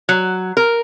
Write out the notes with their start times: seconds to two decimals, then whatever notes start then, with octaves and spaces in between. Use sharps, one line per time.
0.09 F#3
0.57 A#4